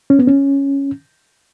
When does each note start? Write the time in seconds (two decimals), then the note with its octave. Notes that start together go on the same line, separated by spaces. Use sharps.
0.10 C#4
0.19 B3
0.27 C#4